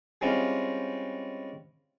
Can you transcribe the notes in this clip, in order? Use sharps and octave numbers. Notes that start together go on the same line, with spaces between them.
G3 G#3 C4 C#4 E4 F4